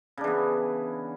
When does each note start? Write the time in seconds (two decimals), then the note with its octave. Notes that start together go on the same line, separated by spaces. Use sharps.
0.17 C#3
0.21 D4
0.24 E3
0.27 B3